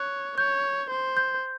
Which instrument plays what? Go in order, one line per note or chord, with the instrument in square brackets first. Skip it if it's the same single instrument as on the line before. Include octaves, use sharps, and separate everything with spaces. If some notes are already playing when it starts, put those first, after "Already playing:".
Already playing: [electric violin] C#5 [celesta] F#6
[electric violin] C#5 [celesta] G6
[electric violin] C5
[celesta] G6